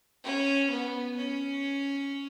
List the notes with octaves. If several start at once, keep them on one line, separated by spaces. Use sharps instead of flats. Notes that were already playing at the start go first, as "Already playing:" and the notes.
C#4
B3
C#4